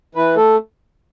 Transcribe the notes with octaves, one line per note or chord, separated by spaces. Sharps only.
E3 B4
A3 A4